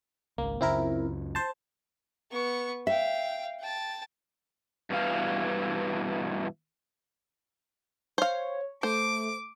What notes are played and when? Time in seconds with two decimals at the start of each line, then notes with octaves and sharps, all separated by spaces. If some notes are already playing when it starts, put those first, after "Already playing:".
0.38 G#1 C#2 A#3
0.61 C#2 F#2 C#3 C4 E4 A#4
1.35 C5 A5
2.31 B3 C#6
2.87 E5 F5 G5
3.60 G5 A5
4.90 G2 B2 E3 F5
8.18 C5 C#5 F5
8.83 A3 C5 D6